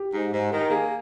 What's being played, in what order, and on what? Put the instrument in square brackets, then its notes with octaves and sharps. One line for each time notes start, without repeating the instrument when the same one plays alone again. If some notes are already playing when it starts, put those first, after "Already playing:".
Already playing: [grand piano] G4
[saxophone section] G#2
G#2
D#3
[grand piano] A#4
[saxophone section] A#3 [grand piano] G#4